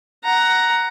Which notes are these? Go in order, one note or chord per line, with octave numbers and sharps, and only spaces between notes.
F#5 A#5